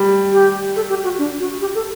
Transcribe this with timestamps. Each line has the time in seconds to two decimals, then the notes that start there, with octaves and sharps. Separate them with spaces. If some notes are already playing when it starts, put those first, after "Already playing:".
Already playing: G3
0.32 G4
0.76 A4
0.89 G4
1.04 F#4
1.18 D4
1.39 F#4
1.60 G4
1.75 A4